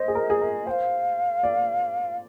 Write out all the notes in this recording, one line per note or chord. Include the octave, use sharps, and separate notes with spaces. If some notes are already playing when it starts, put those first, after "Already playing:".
Already playing: C5 D#5
G#4
A#4
G#4
A#4
C5 F5 G5
D5